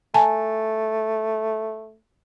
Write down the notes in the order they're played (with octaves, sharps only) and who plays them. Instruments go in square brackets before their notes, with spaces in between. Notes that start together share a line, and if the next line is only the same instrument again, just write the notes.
[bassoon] A3 [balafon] G#5 A5